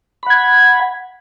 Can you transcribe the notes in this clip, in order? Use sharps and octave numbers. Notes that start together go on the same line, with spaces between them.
F#5 B5 G#6